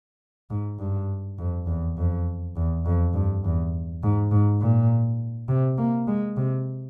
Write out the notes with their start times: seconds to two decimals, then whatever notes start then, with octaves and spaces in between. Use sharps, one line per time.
0.50 G#2
0.79 G2
1.38 F2
1.67 E2
1.97 F2
2.56 E2
2.85 F2
3.14 G2
3.44 E2
4.03 G#2
4.31 G#2
4.61 A#2
5.49 C3
5.78 A#3
6.07 G#3
6.37 C3